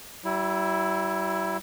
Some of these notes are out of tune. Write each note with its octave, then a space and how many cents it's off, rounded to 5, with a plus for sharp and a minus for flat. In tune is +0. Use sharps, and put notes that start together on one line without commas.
G3 -45 E4 +0